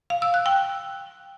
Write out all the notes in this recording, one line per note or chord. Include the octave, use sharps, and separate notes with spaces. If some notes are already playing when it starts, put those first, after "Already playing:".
F5
E6
F#6
G5